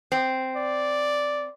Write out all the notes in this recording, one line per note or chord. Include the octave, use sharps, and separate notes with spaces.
C4
D5